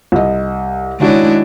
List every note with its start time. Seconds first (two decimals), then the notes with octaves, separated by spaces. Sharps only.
0.12 C2 D#5
1.00 D#3 G#3 D4 E4 F#4 C#5